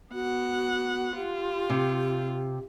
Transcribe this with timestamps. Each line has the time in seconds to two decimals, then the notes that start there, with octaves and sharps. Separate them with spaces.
0.13 B3 F#4 F#5
1.15 F4 G4
1.70 C3